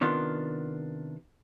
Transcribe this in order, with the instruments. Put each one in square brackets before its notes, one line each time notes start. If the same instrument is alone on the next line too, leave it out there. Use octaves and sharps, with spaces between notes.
[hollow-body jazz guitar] C3 D#3 B3 D4 F4